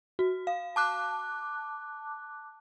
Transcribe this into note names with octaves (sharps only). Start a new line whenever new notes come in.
F#4
F5
A5 D6 F#6